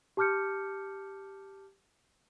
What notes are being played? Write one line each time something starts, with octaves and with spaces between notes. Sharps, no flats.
G4 A5 D6 F6 G6 C#7